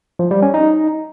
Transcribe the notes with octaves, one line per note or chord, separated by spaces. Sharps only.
F3
G3
C#4
D#4